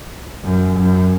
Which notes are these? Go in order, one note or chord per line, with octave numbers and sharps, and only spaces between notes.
F#2
F#2